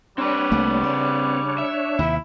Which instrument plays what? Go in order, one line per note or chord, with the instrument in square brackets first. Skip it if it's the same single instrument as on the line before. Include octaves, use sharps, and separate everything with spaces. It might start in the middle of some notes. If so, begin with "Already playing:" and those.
[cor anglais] G3 [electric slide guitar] C4 B4 [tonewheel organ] D4 C#5
[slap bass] C2 A3 A#3
C#3
[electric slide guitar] E5
[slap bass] D#2 C3 [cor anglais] E4